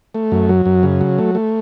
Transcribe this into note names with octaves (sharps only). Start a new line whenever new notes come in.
A3
F#2
F#3
F#2
C#3
F#3
A3
A3